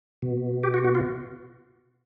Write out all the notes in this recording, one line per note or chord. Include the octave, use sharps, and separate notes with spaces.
B2
G4
F#4
F#4
F4